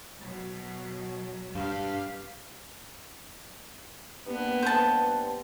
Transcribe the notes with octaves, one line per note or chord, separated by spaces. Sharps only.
B2 F#3
G2 G4 F5
G2 A#3 B3
C5 A5